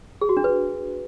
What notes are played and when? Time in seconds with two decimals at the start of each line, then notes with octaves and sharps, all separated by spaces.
0.21 G#4
0.29 F#4
0.37 D4
0.44 B4